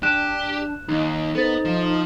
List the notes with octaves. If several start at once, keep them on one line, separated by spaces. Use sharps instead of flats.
D4 G4 F#6 E7
D#2 D#4
B3 A4 C5 A6
F3